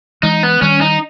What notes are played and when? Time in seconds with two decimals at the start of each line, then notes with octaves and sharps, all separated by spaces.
0.23 E3 G#3 D#4
0.43 B3
0.62 D#3 G3 C#4
0.81 D#4